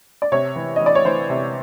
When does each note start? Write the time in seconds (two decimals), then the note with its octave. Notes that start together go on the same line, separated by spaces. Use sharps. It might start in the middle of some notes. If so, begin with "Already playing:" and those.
0.22 D5
0.32 C3 C#5
0.56 E3
0.76 D#5
0.81 E3
0.86 D5
0.95 C#5
1.05 E3 C5
1.30 C3